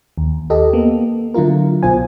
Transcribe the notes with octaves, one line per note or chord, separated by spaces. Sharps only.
D#2
G4 A4 D#5
A#3 B3
D3 F#3 E4 F4 A#4
C2 B2 F4 C5 G#5